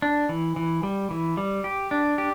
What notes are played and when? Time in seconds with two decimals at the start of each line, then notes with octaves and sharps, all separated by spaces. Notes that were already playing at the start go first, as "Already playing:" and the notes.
0.02 D4
0.29 E3
0.56 E3
0.83 G3
1.11 E3
1.37 G3
1.64 G4
1.91 D4
2.18 G4